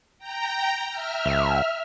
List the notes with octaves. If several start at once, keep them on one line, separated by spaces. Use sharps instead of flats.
G5 A#5
E5 F6
C#2